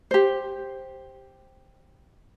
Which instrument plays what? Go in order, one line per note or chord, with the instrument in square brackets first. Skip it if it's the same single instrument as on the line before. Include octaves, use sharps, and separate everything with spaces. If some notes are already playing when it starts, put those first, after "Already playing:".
[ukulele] G4 C5